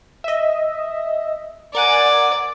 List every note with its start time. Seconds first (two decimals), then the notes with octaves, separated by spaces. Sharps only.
0.24 D#5 E5
1.75 A#4 D5 F#5 G#5